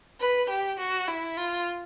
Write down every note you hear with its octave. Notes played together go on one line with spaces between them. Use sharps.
B4
G4
F#4
E4
F4